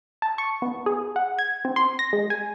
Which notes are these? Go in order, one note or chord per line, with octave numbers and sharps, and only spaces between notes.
A5
C#6
B3
G#4
F#5
G#6
C4
C6
A#6
G#3
G#5